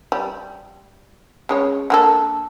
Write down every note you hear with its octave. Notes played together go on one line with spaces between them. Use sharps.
G3
C#3 G#3 C#5
D3 A#3 A4